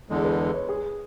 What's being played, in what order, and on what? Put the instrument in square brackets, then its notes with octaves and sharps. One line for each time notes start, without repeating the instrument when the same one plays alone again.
[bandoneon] E2 D3 G#3
[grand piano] B4
C#5
G#4